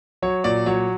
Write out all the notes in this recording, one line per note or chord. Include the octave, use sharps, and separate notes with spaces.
F#3 C#5
A#2 D5
F#3 C#5